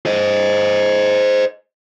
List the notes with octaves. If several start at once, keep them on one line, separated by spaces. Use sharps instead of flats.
C5 D#5